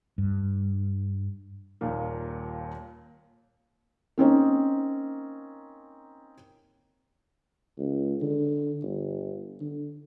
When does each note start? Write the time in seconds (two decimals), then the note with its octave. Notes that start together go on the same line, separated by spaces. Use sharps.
0.18 G2
1.81 D#1 D#2 A#2 A#3
4.18 A#3 C4 C#4 D#4
7.78 C#2
8.22 D3
8.83 G1
9.61 D3